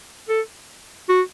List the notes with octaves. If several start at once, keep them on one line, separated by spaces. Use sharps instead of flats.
A4
F#4